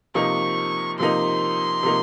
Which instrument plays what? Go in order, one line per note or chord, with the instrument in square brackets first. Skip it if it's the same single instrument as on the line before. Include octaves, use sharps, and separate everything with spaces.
[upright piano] C3 F3 A#3 D#4 [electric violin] C#6
[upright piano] C3 F3 A#3 D#4 [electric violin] C6
[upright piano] C3 F3 A#3 D#4